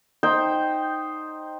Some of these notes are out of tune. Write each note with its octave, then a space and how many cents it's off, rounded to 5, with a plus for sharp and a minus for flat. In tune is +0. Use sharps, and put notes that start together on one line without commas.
D#4 +0 C5 +5 G5 +0